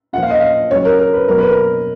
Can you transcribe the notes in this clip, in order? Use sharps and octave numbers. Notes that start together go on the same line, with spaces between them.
A#2 F3 F5 F#5
D#5
F5
C#3 F#3 C#5
A#4
A#4
B4
B2 F#3 A#4
B4
A#4